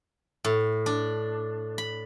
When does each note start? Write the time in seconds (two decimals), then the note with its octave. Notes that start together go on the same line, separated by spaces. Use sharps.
0.44 A2
0.86 D4
1.78 B5